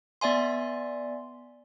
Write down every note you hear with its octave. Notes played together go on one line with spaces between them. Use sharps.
B3 D5 E5 G#5 C6